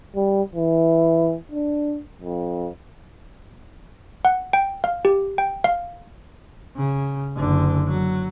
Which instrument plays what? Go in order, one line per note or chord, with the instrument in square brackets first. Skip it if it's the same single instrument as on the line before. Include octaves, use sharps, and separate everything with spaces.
[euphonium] G3
E3
D4
F2
[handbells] F#5
G5
F5
G4
G5
F5
[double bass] C#3
F#1 D3
F#3